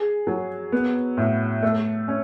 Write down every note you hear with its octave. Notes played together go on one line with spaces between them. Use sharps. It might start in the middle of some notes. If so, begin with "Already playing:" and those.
Already playing: G#4
F#3
B3
A2
A3
C#4